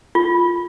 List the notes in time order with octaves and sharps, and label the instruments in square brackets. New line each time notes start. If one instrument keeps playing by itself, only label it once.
[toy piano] F4